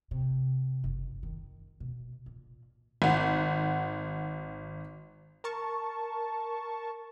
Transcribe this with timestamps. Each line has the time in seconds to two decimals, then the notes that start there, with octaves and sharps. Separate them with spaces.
0.11 C3
0.84 F#1
1.23 D#3
1.80 B2
2.26 A#2
3.02 G#1 F#5
5.44 A#4 A5 C#6